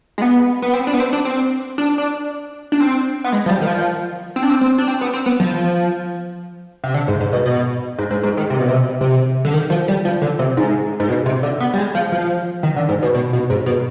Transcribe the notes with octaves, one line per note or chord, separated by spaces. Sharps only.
G#3
B3
B3
C4
D4
B3
C4
D4
C4
D4
D4
D4
C4
B3
G#3
F3
G3
D#3
F3
C4
D4
C4
C4
D4
C4
B3
C4
B3
F3
C3
D3
G#2
G#2
B2
B2
G#2
G#2
G#2
D#3
C3
B2
C3
C3
D3
D#3
F3
G3
F3
D3
C3
G#2
G#2
B2
C3
D3
B3
G3
G#3
F3
F3
D#3
D3
G#2
B2
B2
B2
G#2
B2